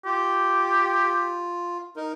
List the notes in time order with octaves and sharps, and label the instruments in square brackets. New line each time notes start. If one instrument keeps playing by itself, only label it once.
[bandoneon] F4 [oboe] G4
[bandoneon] D#4 A#4